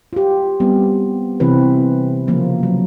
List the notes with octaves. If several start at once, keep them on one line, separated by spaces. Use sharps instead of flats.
F4 G4
G3 B3 C4
C3 E3 C4 B4
C#3 F3 A#3
F#3